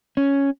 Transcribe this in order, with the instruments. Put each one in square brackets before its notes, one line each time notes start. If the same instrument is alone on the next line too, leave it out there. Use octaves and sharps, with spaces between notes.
[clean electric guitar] C#4